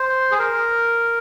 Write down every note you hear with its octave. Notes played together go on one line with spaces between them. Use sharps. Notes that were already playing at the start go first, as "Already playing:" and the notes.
Already playing: C5
G#4
A#4